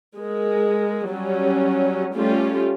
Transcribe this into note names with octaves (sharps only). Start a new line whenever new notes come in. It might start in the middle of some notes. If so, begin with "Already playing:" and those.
G#3 A#4
F#3 G3 C#4
G3 A3 C#4 F4 G4